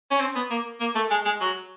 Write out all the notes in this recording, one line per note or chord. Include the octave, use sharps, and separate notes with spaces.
C#4
C4
B3
A#3
A#3
A3
G#3
G#3
F#3